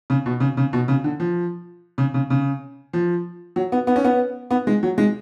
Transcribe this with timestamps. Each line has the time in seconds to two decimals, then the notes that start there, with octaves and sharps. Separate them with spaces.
0.10 C#3
0.26 B2
0.40 C#3
0.57 C#3
0.73 B2
0.88 C#3
1.04 D3
1.20 F3
1.98 C#3
2.14 C#3
2.30 C#3
2.93 F3
3.56 F#3
3.72 B3
3.87 B3
3.96 C#4
4.04 B3
4.51 B3
4.67 G#3
4.83 F#3
4.98 G#3